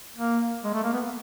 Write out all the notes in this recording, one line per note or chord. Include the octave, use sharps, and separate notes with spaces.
A#3
G#3
A3
A#3
B3